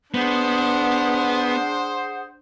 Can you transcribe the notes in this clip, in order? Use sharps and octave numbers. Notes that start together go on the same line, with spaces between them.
B3 D4 G#4 C5 F#5 D#6